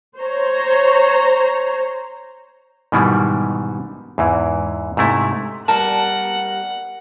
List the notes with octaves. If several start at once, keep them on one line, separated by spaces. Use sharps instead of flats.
C5 C#5 A#5
G#2 B2 D#3 E3 G3
E2 G#2 E3
G#2 C3 A3 E4
G3 A#4 F#5 A5